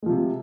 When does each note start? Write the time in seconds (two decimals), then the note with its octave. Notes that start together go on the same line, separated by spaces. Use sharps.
0.02 G#3
0.06 F3
0.10 C3